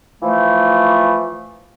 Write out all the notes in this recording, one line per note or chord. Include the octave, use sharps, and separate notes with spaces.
E3 F3 A3